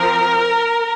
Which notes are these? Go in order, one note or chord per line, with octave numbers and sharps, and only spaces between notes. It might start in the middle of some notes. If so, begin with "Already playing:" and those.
Already playing: F3 C4 A#4